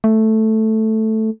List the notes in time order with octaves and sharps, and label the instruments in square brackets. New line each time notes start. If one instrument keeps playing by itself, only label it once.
[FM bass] A3